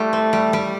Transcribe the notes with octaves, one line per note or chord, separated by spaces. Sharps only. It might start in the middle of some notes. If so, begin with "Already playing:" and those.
Already playing: G3 A3 E4
C4
G3
G3